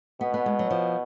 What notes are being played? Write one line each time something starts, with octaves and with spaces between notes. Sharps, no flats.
B2 B3
B3
G#3
F#3
F3